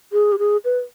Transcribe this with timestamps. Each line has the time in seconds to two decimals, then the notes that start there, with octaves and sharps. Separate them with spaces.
0.13 G#4
0.33 G4
0.39 G#4
0.65 B4